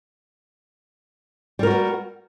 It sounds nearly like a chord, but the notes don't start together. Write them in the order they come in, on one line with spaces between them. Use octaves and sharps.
G3 A#4 F#4 B3